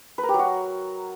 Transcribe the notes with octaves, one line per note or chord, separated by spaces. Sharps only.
B4
A#4
G4
F#3
F#4